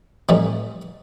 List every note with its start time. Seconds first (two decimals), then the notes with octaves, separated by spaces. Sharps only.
0.29 A2 E3 G3 C4 D#4